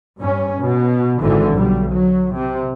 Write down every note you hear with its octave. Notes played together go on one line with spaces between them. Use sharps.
G2 C#4
B2
G#1 D3 E3
B1 G3
F#3
C3